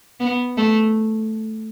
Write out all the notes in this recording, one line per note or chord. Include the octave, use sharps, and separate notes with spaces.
B3
A3